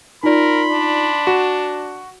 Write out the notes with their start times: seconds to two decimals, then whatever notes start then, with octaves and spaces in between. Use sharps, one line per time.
0.23 D#4 F4 A#4 D5 B5 C6
0.71 D4
1.27 F#4 E7